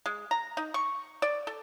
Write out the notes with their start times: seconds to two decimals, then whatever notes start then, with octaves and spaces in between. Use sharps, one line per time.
0.06 G#3
0.31 A#5
0.57 D#4
0.74 C#6
1.22 D5
1.47 A4